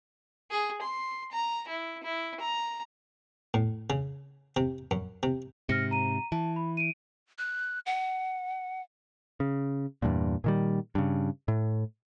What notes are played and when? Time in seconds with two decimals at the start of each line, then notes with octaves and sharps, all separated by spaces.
0.50 G#4
0.81 C6
1.32 A#5
1.68 E4
2.03 E4
2.40 A#5
3.54 A2
3.90 C#3
4.56 C3
4.91 F#2
5.23 C3
5.69 G#2 C3 F6 A#6 C#7
5.91 A#5 D#7
6.32 E3 A5
6.56 B5
6.77 D7 D#7
7.38 F#6
7.86 F#5
9.40 C#3
10.02 E2 G2 A#2
10.44 A#2 D#3 G3
10.95 G2 C#3
11.48 A2